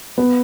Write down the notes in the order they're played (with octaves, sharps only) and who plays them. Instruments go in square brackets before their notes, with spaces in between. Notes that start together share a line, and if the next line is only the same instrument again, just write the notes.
[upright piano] B3